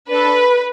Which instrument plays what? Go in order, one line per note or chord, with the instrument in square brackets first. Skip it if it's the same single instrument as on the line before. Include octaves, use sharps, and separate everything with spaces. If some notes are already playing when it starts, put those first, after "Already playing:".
[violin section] D4 A4 B4